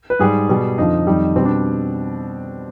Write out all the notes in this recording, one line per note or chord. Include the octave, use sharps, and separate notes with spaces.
B4
G#2 G3 G#4
B2 G3
F2 D3 F3 D#4
F2 D#3 G3
B2 G3 C4
D4